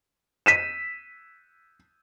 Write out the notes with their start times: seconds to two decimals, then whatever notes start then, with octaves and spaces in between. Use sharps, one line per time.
0.46 B6 D#7 E7